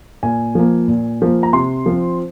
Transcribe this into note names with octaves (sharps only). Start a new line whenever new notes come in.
A#2 G#5
F3 A#3
A#2
F3 A#3
A#5
C3 C6
F3 C4